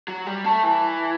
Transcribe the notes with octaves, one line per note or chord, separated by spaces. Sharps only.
F#3
G3
A3
E3